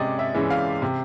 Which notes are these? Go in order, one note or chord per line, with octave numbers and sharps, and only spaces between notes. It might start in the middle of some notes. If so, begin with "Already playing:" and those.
Already playing: C3 G#3 C#4 D5 D#5
E5
E3 G#3 C#4
F5
C3